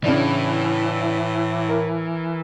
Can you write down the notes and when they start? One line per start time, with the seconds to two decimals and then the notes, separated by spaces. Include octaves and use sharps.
0.04 A2 C#3 E3 D4
1.69 A#4